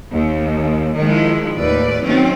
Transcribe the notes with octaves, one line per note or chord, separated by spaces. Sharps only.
D#2
D#3 F3 G#3 E4
D#2 A2 B4 D5
D#3 F#3 C4 C#4